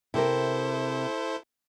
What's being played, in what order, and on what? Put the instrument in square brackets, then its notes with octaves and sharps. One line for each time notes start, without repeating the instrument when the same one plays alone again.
[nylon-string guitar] C3 A#4 [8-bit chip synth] E4 A4 C5